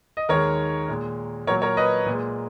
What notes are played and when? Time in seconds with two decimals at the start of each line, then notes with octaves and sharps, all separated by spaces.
0.17 D#5
0.29 D#2 D#3 G#3 A#4 C#5
0.88 A#2 G#3
1.47 A#2 F#3 A#4 C#5
1.62 A#4 C#5
1.77 B4 D#5
2.06 A#2 G#3